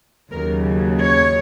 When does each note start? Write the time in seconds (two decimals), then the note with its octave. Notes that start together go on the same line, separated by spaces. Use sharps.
0.32 D#2 C#3 F#3 A#4
1.02 C#5